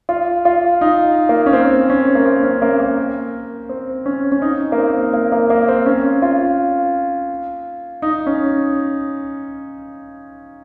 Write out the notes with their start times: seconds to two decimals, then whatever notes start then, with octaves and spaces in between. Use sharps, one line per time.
0.09 F4
0.45 F4
0.81 D#4
1.29 A#3
1.46 C#4
1.53 C4
1.90 C#4
2.15 A#3
2.26 C4
2.43 C#4
2.62 A#3
2.80 A#3
3.69 C4
4.06 C#4
4.32 C#4
4.42 D#4
4.72 A#3
4.77 C4
5.14 A#3
5.32 A#3
5.50 A#3
5.68 C4
5.86 C#4
6.22 F4
8.02 D#4
8.27 C#4